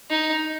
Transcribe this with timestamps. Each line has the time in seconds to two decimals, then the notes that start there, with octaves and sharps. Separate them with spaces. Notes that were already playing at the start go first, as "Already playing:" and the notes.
0.10 D#4